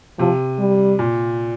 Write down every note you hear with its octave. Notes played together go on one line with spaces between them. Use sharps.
C3 F3
G3
A#2